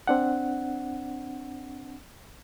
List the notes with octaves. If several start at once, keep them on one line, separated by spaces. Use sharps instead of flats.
C4 D4 F#5